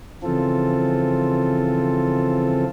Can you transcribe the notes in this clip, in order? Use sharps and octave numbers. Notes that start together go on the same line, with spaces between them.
C#3 E3 F3 C4 F4 A4